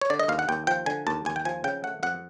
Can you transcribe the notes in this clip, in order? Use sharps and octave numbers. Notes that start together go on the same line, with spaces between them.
C#5
D3 D5
D#5
D#2 F5
F#5
D#2 G5
F3 G5
D3 G#5
D#2 A5
D#2 G#5
G5
F3 G#5
C#3 G5
A3 F#5
F2 F#5